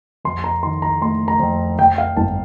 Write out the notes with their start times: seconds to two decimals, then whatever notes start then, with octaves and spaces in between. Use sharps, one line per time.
0.25 F2 C6
0.44 A#5
0.63 D#3 C6
0.82 A#5
1.01 A3 C6
1.28 A#5
1.40 F2
1.78 F2 G5
1.98 F5
2.17 G1 A5